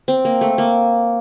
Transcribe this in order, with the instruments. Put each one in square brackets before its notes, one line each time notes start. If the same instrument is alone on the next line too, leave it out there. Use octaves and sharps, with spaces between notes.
[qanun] C4
A#3
A3
A#3